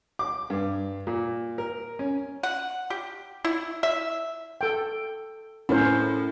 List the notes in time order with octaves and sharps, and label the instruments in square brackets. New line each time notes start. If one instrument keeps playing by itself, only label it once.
[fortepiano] D6
G2
A#2
A#4
C#4
[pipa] F#5
G4
E4
E5
[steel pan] A4 G5
[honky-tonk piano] A2 [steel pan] C#4 A#4 C5